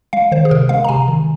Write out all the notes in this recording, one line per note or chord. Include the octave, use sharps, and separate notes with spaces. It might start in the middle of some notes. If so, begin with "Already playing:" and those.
G#3 F5
D#3 C5
G#4
C3 A#4
G#3 F5
A#5
C3 G#5
D#3